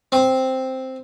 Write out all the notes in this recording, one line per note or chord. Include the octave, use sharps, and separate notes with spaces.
C4